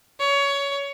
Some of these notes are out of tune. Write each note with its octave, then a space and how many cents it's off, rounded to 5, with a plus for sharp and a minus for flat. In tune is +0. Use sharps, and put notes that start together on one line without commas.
C#5 +20